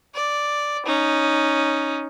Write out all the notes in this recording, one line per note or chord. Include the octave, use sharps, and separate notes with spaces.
D5
C#4 D#4